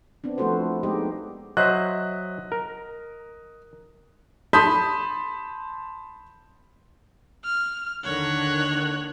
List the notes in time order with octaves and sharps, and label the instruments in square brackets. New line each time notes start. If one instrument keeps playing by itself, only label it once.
[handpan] B3 C4 D4
F3 A3 E4 F#4 A4 C5
G#3 B3 D#4 G4 D#5
[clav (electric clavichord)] F#3 C5 E5 [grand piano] D#5 F#6
[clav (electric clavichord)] A#4
[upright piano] A5 B5 C6 D#6 G6 B6
[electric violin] F6
[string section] D#2 D3 D#3 [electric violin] C#5 F#6